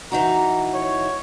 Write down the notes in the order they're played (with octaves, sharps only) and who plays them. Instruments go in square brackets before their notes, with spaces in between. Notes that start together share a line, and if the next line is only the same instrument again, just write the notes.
[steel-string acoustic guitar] E3 D#4 F#4 [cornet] A#5
[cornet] C#5